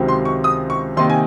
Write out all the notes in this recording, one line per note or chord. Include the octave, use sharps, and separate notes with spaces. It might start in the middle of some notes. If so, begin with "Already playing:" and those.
Already playing: C#2 C3 D#3 F#3 C4
C6
C#6
D#6
C#6
C3 D#3 A#3 D#4 C6
G#5